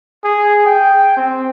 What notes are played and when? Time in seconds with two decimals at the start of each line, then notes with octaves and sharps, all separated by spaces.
0.24 G#4
0.66 G5
1.17 C4